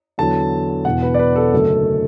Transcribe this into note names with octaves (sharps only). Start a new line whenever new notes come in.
E2 D3 F#3 A5
E1 E2 B2 F#5
B4
D5
B4
A4
F#1 F#2 D3 F#3 A3